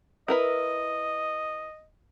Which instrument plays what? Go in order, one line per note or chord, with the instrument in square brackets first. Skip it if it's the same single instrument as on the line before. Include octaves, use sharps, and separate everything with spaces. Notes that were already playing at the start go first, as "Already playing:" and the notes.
[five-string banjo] E4 A#4 B4 [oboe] D#5